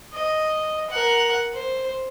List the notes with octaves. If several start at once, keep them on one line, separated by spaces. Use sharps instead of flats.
D#5
A#4 F#5
C5